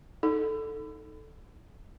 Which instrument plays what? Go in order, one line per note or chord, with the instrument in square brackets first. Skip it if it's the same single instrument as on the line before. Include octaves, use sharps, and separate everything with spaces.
[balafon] D#4 A4